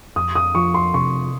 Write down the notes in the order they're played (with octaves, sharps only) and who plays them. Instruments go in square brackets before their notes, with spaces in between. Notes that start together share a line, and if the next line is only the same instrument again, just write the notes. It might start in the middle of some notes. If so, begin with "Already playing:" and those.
[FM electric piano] F2 [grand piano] D#6
[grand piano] D#6
[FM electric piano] F3 [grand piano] C#6
[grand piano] C6
[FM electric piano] C3 [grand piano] C#6